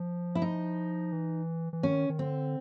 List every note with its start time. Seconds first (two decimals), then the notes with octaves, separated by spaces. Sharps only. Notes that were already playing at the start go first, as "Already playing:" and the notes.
Already playing: F3
0.35 E4
0.42 D#4
1.12 E3
1.73 E3
1.83 D#3 C#4
2.09 D#3
2.19 D3 C4